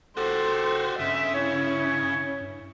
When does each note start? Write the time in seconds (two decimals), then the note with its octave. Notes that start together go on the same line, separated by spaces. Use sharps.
0.17 F1 F#4 G4 A4 C5
0.99 G2 C#3 E5
1.34 C#4 E4 C#5
2.41 G2